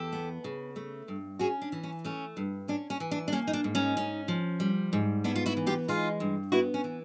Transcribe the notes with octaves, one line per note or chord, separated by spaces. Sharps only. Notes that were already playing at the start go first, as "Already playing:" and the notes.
Already playing: E2 G4 A4
B3
C#3
A3
G2
C#4 F#4 G#4
D4
E3
C#4
A3 C#4
G2
C#4 D4
C#4
E3
D4
D4
A#3 C#4
D#4
D4
G#2
C#4 D#4
C#4
F3
G3
G#2
B3 D4 E4
F4
E4 F#4
E3
F4 G4
G#3 D#4 F4
G2
B3 E4 F#4
C#4
E3